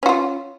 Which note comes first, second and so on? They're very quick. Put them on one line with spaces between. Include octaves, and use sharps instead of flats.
C#4 F#4 F4